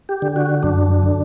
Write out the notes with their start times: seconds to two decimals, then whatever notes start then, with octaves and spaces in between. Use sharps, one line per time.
0.09 G4
0.22 D3
0.36 F#4
0.63 F#2 D4
1.03 D3